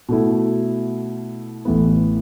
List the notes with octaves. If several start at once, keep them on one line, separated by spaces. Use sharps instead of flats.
B2 A3 E4
A1 A2 E3 B3